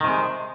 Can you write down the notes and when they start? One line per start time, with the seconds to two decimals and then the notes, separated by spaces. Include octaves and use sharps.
0.01 D#3
0.04 C3
0.08 G#3